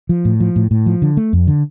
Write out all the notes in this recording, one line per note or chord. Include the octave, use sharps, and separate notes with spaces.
F3
A2
F3
A2
A2
F3
D3
A3
F2
D3